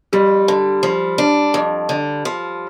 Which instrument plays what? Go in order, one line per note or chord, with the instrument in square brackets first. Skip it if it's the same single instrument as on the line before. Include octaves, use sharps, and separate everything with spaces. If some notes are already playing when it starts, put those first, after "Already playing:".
[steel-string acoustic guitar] F2 [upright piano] G3
[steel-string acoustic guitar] D3
F3
D4
F2
D3
F3